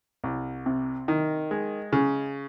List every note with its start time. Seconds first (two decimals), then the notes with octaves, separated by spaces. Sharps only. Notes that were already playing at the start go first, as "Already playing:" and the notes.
0.24 C2
0.66 C3
1.08 D#3
1.51 G#3
1.93 C#3